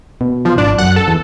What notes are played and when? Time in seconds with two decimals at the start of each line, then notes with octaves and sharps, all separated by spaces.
0.21 B2
0.45 B2 F3
0.58 G#1 D4
0.78 F#2 F#5
0.96 A4
1.08 E2